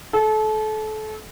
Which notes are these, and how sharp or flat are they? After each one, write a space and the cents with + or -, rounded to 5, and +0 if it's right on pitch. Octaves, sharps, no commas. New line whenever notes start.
A4 -30